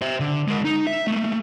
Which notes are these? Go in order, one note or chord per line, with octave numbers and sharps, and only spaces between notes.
C5 E5
D3
G#3 A#4
D#4
E5
A3 A#3